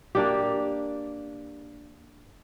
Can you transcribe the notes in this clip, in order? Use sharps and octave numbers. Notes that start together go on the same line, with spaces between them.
A#3 D4 G4